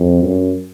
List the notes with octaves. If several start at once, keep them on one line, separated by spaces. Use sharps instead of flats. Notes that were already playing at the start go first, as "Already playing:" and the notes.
Already playing: F2
F#2